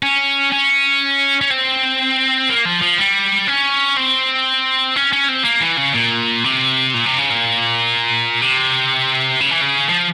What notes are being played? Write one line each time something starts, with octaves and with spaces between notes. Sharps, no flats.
C#4
C#4
C#4
C4
A#3
F3
F3
G3
C#4
C4
C#4
C#4
C4
A#3
E3
C#3
A#2
C3
A#2
C3
C#3
A#2
C3
C#3
E3
C#3
F3